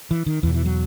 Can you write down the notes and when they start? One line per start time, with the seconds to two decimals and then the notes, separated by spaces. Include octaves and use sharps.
0.11 E3
0.26 D#3
0.43 E2 E3
0.47 B2
0.54 E3
0.66 F#3